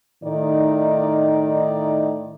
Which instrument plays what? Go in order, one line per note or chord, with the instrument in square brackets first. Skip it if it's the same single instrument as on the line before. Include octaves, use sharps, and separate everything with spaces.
[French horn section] A2 D#3 D#4 D5